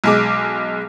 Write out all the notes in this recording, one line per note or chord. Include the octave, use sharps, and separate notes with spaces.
B1 G#3 D6